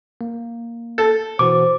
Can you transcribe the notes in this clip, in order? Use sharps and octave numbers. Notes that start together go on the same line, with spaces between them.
A#3
A4
B2 E3 F#4 C5 D6